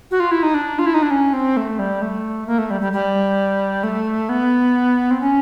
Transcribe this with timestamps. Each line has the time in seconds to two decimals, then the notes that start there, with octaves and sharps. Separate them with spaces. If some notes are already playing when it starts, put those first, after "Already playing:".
0.11 F#4
0.20 F4
0.31 E4
0.43 D#4
0.54 D4
0.79 F4
0.86 E4
0.94 D#4
1.03 D4
1.11 C#4
1.33 C4
1.57 A3
1.79 G3
2.02 A3
2.47 A#3
2.58 A3
2.71 G3
2.81 G3
2.93 G3
3.83 A3
4.29 B3
5.11 C4
5.21 C#4